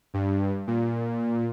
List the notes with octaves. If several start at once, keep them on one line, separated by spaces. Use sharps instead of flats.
G2
A#2